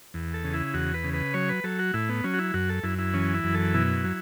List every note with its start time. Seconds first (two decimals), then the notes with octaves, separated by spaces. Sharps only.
0.14 E2
0.34 A4
0.44 C#3
0.54 E4
0.74 E2 F#4
0.94 B4
1.04 C#3
1.14 B4
1.34 F#3 C#5
1.49 B4
1.64 F#3 A4
1.79 F#4
1.94 A2 E4
2.09 B3
2.24 F#3 C#4
2.34 F#4
2.39 E4
2.54 F#2 F#4
2.69 A4
2.83 F#2 E4
2.98 E4
3.14 E3 C#4
3.34 E4
3.44 F#2
3.54 A4
3.74 B2 E4
4.04 F#3